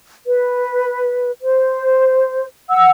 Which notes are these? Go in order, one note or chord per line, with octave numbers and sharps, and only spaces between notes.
B4
C5
F#5 E6